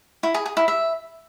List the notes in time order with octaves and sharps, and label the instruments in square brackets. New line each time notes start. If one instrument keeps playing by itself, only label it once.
[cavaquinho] E4
G#4
G#4
E4
E5